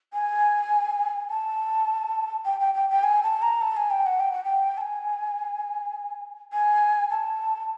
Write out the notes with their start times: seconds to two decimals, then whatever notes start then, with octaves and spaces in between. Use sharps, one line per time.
0.14 G#5
1.30 A5
2.45 G5
2.60 G5
2.74 G5
2.90 G5
3.03 G#5
3.23 A5
3.42 A#5
3.61 A5
3.77 G#5
3.90 G5
4.06 F#5
4.20 G5
4.32 F#5
4.44 G5
4.77 A5
4.81 G#5
6.53 G#5
7.10 A5